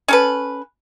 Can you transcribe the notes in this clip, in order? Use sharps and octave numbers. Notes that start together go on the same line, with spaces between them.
C#4 A4 B4